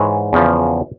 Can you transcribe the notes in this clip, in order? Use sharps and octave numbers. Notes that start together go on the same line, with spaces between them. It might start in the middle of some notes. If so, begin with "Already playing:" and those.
Already playing: G#2 E3 G#3 C#5
E2 C#3 F3